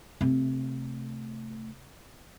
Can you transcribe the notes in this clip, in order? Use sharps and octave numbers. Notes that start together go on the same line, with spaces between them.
C3 A3